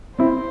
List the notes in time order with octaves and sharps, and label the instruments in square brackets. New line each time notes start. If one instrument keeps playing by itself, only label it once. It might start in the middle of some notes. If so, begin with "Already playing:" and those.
[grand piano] C4 E4 [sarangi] C5